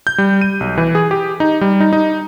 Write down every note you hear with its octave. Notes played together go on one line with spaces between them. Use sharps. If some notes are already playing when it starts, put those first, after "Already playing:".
G6
G3
D#7
B1
E3
G#4
G4
D#4
G3
D#4
D#4